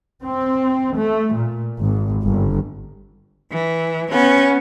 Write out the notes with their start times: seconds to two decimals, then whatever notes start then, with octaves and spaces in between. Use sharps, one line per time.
0.23 C4
0.96 A3
1.35 A#2
1.78 G#1
2.24 G1
3.52 E3
4.11 B3 C#4